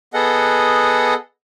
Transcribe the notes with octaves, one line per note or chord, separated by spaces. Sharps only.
B3 G#4 A4 D#5 F#5